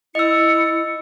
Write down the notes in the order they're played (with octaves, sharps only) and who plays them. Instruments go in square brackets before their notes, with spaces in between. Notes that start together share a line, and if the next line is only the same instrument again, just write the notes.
[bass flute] E4 [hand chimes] D#5 E6 [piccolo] C#7